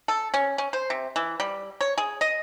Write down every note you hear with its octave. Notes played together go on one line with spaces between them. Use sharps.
A4
C#4
C#4
C5
C3
E3
G3
C#5
G#4
D#5